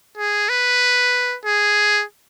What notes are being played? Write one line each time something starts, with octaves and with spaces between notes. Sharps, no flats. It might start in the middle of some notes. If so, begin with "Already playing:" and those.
G#4
B4
G#4